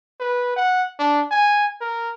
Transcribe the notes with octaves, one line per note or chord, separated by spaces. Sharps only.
B4
F#5
D4
G#5
A#4